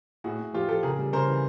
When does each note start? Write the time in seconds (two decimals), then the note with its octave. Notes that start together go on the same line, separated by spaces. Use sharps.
0.24 A2 F#4 G#4
0.39 A2
0.53 F3 F4 G4
0.69 F3 G4 A4
0.83 C#3 G#4 A#4
0.98 G3
1.13 C#3 A#4 C5
1.27 E3